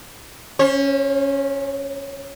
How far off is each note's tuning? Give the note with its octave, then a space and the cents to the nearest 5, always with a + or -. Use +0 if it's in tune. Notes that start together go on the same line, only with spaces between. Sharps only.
C#4 +0 C5 +45